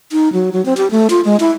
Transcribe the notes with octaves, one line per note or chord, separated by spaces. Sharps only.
D#4
F#3
F#3
C4
G4
A3
F4
G#3
E4